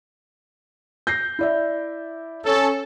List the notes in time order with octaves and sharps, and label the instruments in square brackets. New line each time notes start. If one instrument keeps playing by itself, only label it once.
[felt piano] G6 A#6 C7
E4 D5 E5
[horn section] C#4 A4